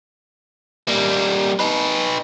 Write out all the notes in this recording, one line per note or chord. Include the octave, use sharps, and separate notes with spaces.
G3 A#3
D#4 B4